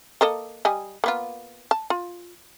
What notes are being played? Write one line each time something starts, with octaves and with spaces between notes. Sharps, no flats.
A#3 A4 D#5
G3 D#5 G#5
A#3 B3 F4
A5
F4